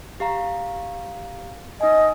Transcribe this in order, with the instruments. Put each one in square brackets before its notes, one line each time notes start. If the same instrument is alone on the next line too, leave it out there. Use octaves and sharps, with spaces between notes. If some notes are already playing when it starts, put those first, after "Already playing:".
[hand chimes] G4 F5 A#5
[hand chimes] D#4 G#5 [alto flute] D#5